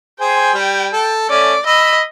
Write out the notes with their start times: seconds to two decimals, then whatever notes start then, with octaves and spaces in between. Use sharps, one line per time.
0.21 G#4 C5 G5 G#5
0.54 G3
0.93 A4
1.30 A3 C#4 D5
1.66 D#5 B5 E6